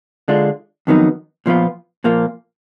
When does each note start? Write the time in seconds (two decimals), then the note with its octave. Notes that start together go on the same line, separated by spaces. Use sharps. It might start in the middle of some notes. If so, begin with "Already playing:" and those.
0.28 D3 G#3 D4 F4
0.87 F2 D#3 F#3 B3 D#4
1.46 A#2 F3 B3 F4
2.04 A#2 F3 A#3 F4